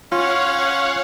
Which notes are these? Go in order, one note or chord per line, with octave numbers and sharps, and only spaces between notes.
C#4 F4 C#5 F5 F#5